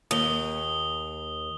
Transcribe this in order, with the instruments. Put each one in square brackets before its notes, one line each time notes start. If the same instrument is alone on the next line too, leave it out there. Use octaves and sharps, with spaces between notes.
[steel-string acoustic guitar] D#2 [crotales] D#6 G7